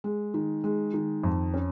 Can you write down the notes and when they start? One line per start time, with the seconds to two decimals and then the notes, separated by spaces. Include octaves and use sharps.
0.04 G#3
0.34 D#3
0.64 G#3
0.94 D#3
1.24 F2
1.54 C#4